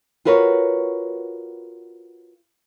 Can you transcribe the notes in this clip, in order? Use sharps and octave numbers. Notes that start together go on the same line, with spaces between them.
F4 F#4 A#4 B4 C#5